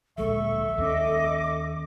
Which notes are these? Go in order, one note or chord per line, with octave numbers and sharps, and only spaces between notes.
D1 A#1 G#3 A4 E5 C#6
D#2 A#3 C#4 D#5 D6